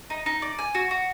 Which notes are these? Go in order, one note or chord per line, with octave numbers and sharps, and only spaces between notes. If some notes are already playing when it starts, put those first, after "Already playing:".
D#4
D#4
D5
G#5
F#4
F#4